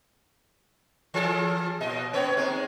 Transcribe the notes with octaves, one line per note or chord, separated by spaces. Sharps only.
E3 G#4 A4
A#2 D#5
A#3 B3 C#5
G#3 C4 D#4